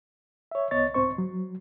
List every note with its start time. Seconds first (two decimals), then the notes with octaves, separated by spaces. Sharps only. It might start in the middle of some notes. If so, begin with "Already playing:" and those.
0.51 C#5 E5
0.71 C2 B3 C#5 D#5 A6
0.94 C2 G#2 C4 C5 C#6
1.18 F#3